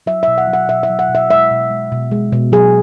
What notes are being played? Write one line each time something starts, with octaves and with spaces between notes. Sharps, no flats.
F#3 E5
B2 E5
F#5
F#3
F#5
B2 E5
E5
F#3
F#5
B2
E5
G#3 E5
B2
G#3
B2
G#3
B2
F#3 G#4